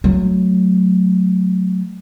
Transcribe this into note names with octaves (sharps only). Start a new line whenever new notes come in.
F#3 A3